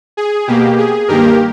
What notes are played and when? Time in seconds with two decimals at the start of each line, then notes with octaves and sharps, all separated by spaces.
0.17 G#4
0.47 B2 A#3 G4
0.78 G#4
1.08 G2 D#3 A#3 G4 A#4